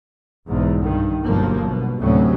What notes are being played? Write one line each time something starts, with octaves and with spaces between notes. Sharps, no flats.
B1 E2 G#2
G2 D#3
G1 G2 B2 F3 F#3 A#3
B2
D2 A2 C3 F#3 C#4